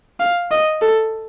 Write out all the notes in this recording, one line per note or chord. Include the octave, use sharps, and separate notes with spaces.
F5
D#5
A4